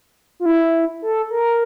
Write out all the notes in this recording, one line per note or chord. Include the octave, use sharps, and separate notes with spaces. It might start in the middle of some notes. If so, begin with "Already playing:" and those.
F4
E4
A4
A#4